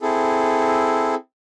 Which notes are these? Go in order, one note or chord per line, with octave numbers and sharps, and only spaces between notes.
C4 E4 G#4 A4